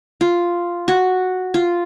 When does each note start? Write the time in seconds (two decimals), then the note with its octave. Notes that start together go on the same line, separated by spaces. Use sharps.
0.21 F4
0.88 F#4
1.54 F4